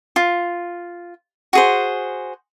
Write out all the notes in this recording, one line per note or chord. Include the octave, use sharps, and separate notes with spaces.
F4
F#4 G#4 C5